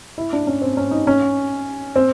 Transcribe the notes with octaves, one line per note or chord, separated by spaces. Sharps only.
E4
D4
C#4
C4
C#4
D#4
C#4
C4